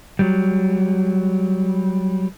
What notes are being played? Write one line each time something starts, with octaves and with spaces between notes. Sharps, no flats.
F#3 G3